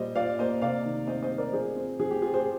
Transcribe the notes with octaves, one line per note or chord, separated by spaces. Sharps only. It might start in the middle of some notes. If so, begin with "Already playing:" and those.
Already playing: A#2 G3 C5 D#5
F4 D5 F5
A#3 C5 D#5
C3 D5 F5
D#3
C4 C5 D#5
C5 D#5
G3
A#4 D5
F3 G#4 C5
C4
F3 G#4
G4
F4 G#4
G#4 C5